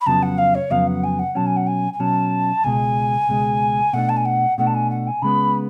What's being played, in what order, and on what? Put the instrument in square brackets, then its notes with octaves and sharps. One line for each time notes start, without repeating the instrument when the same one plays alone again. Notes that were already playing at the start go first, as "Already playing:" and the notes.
[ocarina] B5
[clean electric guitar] F2 C#3 F#3 B3 [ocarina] A5
[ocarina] F#5
F5
C#5
[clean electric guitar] F2 C#3 F#3 B3 [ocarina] F5
[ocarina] F#5
G#5
F#5
[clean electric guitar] B2 F#3 C#4 [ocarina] A5
[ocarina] G#5
F#5
G#5
G#5
[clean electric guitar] B2 F#3 C#4 [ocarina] A5
[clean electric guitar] C#2 B2 G#3 [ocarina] G#5
[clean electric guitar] C#2 B2 G#3
[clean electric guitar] B2 A3 D4 [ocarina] F#5
[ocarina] A5
G#5
F#5
[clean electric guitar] B2 A3 D4 [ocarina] F#5
[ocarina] A5
G#5
F#5
G#5
[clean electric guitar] C#3 G#3 B3 [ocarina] B5